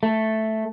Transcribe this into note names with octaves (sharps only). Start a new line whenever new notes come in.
A3